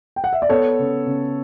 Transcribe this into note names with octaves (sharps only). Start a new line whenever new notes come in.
G5
F#5
E5
D5
B3 A4 C#5
C#3
C#3